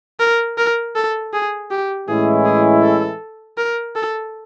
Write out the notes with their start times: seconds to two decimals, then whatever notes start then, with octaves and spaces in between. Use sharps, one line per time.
0.20 A#4
0.58 A#4
0.96 A4
1.33 G#4
1.71 G4
2.07 A2 E3 G#3 C#4 E4 G#4
2.45 G#4
2.83 A4
3.58 A#4
3.95 A4